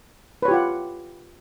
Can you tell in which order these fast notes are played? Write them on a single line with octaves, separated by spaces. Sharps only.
B4 C#5 G4 F4 F#5